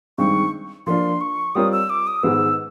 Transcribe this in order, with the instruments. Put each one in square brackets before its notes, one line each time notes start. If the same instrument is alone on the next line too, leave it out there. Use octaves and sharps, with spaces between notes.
[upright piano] G2 D#3 G#3 C4 [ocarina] C#6
[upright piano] F3 A#3 D4 F4 [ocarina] C6
[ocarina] C#6
[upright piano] G3 C4 F4 A#4 C#5 [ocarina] D#6
[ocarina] E6
D6
D#6
[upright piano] G#2 D#3 G#3 B3 [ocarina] E6